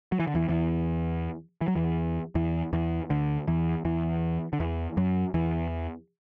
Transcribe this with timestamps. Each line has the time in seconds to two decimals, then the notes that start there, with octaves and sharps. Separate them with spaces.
0.12 F#3
0.20 E3
0.27 D3
0.35 E2 E3
0.49 E2 E3
1.61 E3
1.68 F#3
1.76 E2 E3
2.35 E2 E3
2.73 E2 E3
3.10 D2 D3
3.48 E2 E3
3.85 E2 E3
4.53 D3
4.60 E2 E3
4.97 F#2 F#3
5.34 E2 E3